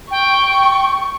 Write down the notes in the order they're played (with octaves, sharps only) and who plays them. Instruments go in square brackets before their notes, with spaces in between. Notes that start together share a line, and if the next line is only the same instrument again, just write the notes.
[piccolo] G5 [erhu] C#6